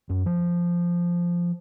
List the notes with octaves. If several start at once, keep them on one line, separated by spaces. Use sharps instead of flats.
F#2
F3